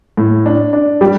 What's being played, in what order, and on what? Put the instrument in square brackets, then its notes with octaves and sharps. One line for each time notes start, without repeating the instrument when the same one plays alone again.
[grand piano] A2
D4
D4
[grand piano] G3 [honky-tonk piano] G4